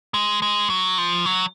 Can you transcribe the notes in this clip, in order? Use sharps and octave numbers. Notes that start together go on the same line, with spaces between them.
G#3
G#3
F#3
F3
F#3